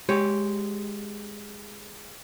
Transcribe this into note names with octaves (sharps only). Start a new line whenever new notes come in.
G#3 G4 C#5